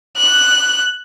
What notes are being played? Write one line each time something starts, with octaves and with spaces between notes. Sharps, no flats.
F#6